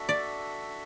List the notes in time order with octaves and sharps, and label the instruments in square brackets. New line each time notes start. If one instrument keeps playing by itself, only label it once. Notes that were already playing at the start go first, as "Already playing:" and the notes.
Already playing: [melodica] D4 F#4 A4 E5
[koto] D5